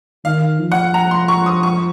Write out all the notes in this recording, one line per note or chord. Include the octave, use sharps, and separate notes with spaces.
D#3 F5
F3
F#5
A#5
C6
C#6
D#6
C#6